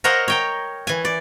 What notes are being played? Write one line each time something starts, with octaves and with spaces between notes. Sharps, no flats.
A#4 C5 C#5 D#5 F#5 A#5
C#5 G5 A#5
E3 G#5
D5